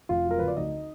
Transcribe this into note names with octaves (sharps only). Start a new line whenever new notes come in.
F1 F4 F5
F#3
A#4
D3 B4
D5
D2 D#4 D#5